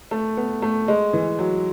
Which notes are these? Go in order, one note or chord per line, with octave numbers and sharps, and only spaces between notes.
A3
B3
A3
G#3
E3
F#3